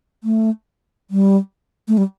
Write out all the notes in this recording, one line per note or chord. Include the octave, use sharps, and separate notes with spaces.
A3
G3
A3
G3